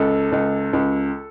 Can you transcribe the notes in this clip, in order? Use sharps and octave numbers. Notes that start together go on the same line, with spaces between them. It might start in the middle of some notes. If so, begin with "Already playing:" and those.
Already playing: C#2 A4
C#2
C#2